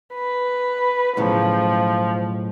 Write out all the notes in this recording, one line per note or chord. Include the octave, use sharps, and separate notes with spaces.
B4
B1 A2 C#3 F3